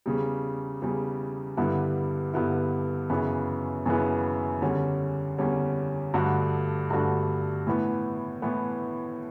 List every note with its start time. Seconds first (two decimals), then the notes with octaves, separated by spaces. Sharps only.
0.06 E2 C#3 G3
0.82 E2 C#3 G3
1.57 G2 D3 G3 B3 E4
2.34 G2 D3 G3 B3 E4
3.10 F#2 C#3 E3 B3
3.86 F#2 C#3 E3 B3
4.62 E2 D3 G3 C#4
5.38 E2 D3 G3 C#4
6.14 G2 D3 A3 D4 F#4
6.90 G2 D3 A3 D4 F#4
7.67 A2 E3 B3
8.42 A2 E3 B3